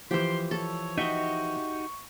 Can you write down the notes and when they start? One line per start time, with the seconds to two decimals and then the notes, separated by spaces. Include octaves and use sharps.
0.11 E3 F3 G4 C5 C6
0.51 A4 C#5
0.98 D#4 F#4 G4 D#5 E5 C#6